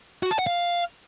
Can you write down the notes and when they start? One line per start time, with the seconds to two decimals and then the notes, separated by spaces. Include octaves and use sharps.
0.23 F#4
0.31 A5
0.39 F#5
0.47 F5